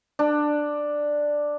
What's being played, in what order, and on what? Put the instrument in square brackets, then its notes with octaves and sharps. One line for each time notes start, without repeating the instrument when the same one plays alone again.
[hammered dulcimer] D4